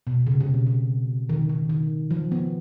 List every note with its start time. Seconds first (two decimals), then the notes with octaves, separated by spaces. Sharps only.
0.07 B2
0.27 C#3
0.40 C3
0.54 B2
0.67 C3
1.29 D#3
1.49 D#3
1.69 D#3
2.11 F3
2.32 B3